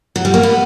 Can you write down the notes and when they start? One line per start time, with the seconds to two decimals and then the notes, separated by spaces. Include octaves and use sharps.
0.16 F#3
0.25 G3
0.34 A#3
0.43 B3